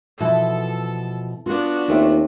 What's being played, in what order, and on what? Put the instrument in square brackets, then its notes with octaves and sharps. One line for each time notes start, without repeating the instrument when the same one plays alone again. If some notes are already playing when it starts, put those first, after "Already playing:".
[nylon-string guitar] B2 F3 [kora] E3 E4 [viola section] A4
[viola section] B3 D4 F#4 [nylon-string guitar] F4 F5
[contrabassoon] D#2 [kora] A3 C4 C#4